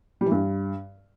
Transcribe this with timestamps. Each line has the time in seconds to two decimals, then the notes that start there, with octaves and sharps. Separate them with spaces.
0.21 G3
0.26 E3
0.32 G2